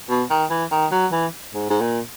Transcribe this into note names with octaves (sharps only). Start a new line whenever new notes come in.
B2
D#3
E3
D#3
F#3
E3
G#2
G#2
A#2